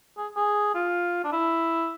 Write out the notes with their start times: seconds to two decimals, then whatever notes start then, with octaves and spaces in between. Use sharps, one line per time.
0.17 G#4
0.37 G#4
0.75 F4
1.24 D4
1.33 E4